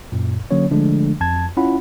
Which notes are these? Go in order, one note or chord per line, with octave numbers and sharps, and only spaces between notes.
F#2 A#2
D3 F#3 A#3 C#4 C#5
D3 F3 G#3 A3 D4
F2 A5 G#6
C#4 E4 F4 F#5 B5